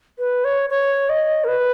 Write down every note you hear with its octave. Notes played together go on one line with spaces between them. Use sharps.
B4
C#5
C#5
D#5
A#4
B4